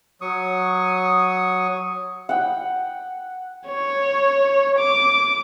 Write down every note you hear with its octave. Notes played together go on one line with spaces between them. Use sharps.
F#3 C#6 D#6
F#5 G5
C#5
D6